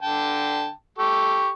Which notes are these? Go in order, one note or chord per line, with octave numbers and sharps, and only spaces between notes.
D3 G5 A5
G4 A4 C#6